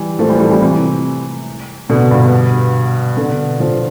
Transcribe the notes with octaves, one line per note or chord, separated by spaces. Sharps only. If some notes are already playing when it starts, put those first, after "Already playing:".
Already playing: E3 G3
F3 A3
E3 G3
A3
E3 G3
E3 G3
C3 E3
B2 D3
G2 B2
B2 D3
D3 F3